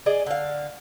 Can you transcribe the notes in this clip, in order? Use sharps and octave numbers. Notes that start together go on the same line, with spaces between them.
G#4 D5 D#5
D3 F5